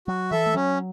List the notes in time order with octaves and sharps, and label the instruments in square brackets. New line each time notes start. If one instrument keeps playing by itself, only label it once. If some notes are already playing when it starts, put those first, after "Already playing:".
[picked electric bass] F#3 [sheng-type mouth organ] F#4
[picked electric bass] E3 [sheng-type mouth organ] A4 E5
[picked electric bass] A3
[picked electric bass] F#3 [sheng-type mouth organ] C#4